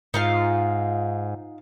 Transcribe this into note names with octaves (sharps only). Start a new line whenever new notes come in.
G#2 D#4 F4 F5